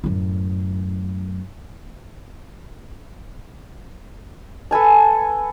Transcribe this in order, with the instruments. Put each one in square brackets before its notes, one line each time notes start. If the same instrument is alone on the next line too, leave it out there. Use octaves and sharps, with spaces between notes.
[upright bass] F#2 A2
[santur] A4 B4 G#5 A5